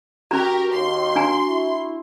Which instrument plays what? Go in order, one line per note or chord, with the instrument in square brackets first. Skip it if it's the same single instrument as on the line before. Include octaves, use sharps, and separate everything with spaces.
[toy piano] C#4 A#5 [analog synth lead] F#4 [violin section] G4 A#4
[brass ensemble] D#2 [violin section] C6
[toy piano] D4 G#5 A#5
[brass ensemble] E4